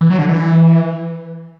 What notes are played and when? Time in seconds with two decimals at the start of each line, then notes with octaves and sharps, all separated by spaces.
0.01 E3
0.10 F#3
0.19 D3
0.29 E3